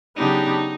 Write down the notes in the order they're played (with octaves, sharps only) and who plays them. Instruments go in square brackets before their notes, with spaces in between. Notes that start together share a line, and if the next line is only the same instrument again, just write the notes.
[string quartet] C#3 F#3 B3 D4 G4 [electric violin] D#4